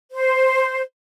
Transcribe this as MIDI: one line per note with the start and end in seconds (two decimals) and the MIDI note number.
0.11 0.81 72